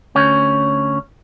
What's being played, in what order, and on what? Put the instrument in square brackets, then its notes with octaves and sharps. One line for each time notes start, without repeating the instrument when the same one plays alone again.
[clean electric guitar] D2 C#4